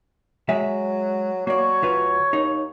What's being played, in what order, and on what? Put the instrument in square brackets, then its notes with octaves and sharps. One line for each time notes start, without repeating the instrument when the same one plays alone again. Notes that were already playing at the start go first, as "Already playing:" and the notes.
[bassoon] F#3 [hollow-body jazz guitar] G#3 E5
[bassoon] F#3 [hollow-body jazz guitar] A#3 D5 [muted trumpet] C#5
[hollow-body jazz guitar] D2 F4 B4
[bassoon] D#2 [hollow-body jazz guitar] D#4